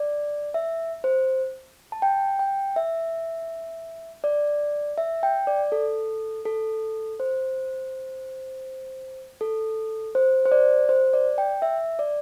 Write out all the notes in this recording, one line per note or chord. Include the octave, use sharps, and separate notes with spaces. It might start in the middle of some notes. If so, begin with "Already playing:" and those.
Already playing: D5
E5
C5
A5
G5
G5
E5
D5
E5
G5
D5
A4
A4
C5
A4
C5
C5
D5
C5
D5
G5
E5
D5